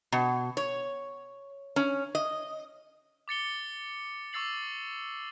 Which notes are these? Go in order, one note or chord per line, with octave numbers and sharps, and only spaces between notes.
B2
C#5
C#4
D#5
D6 A6 C#7 G7
C#6 D6 E6 A6 C7 F#7